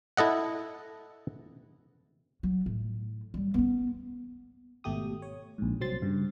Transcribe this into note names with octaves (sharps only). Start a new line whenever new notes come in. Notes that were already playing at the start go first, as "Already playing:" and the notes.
E4 A4 D#5 F#5
F#3
A2
F#3 G3
B3 C#4
G#1 B2 A3 G4 D#6
C#5
A#1 G#2
C2 F#3 C4 C6 A6
G2 C#3